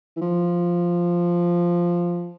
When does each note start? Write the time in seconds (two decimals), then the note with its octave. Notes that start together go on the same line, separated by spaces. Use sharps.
0.17 E3
0.21 F3